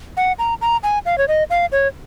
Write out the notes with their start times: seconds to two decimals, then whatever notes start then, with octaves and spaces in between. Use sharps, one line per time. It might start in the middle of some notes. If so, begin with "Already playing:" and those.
0.17 F#5
0.39 A#5
0.61 A#5
0.83 G#5
1.06 F5
1.18 C#5
1.28 D#5
1.50 F5
1.72 C#5